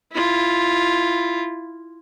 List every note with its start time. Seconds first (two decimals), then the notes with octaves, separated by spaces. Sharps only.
0.13 E4 F4